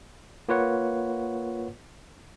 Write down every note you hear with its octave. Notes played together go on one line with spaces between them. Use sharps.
A#3 F4 B4 C#5 F#5